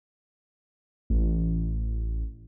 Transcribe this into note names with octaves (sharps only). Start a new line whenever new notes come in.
A1